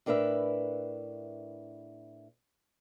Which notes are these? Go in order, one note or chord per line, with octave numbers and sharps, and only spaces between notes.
A2 D4 A#4 B4 E5